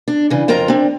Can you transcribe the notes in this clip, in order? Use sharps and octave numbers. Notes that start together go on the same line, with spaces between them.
D4
C#3 E3
F2 F4 A#4 G5 A#5
C4 D4